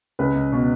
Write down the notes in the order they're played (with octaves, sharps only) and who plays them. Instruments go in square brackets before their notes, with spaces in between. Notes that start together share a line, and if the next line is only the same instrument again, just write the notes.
[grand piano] C#2 B4
C#2
B2